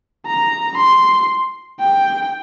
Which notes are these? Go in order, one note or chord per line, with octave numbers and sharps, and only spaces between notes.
A#5
C6
G5